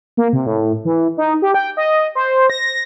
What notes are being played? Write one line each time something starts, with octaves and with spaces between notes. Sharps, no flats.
A#3
C3
A2
E3
D#4
G4
G5
D#5
C5
A#6